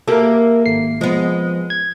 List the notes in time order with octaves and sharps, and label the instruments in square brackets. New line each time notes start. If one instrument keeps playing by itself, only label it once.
[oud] A#3 E4 G4 [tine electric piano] A4 A#4
[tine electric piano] G#1 C7
[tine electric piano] F3 [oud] G#3 B3
[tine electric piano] G#6